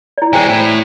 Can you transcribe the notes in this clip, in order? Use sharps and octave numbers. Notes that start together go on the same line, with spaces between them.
E4 D5
E3 G#3 C5 G5 G#5
A2